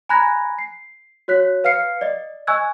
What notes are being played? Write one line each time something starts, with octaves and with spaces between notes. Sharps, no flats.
G#5 A#5 B5 F#6 G#6 A#6
C7
F#4 C#5 F#6 B6
B4 F5 F6 C7 C#7
D5 D#5
D#5 G#5 C#6 E6 F#6 G#6